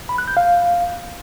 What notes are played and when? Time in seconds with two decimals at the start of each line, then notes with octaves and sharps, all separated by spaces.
0.09 B5
0.18 F#6
0.27 G6
0.37 F5